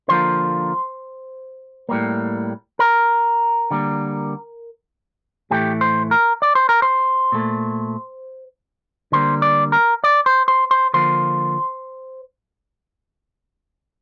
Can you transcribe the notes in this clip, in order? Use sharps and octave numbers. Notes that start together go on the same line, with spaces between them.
D3 F3 A#3 C5
A2 G3 A#3
A#4
D3 G3 A#3
A2 E3 A3 G4
C5
A#4
D5
C5
A#4
C5
A#2 A3
D3 G3 A#3 C5
D5
A#4
D5
C5
C5
C5
D3 F3 A#3 C5